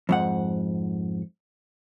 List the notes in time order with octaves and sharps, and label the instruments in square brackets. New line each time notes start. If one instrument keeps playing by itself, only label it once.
[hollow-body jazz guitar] F2 G#2 F#5